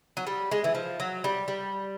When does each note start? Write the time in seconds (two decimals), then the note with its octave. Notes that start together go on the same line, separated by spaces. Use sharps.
0.17 F#3
0.27 G3
0.52 G#3
0.64 E3
0.75 F3
1.00 F#3
1.24 G3
1.48 G3